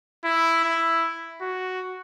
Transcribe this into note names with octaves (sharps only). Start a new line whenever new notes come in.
E4
E4
F#4